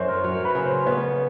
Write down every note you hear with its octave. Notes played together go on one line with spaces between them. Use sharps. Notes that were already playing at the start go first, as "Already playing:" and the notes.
Already playing: F#2 C5 C#5
A#4
F#3
B4
C#3
C5
B3 C#5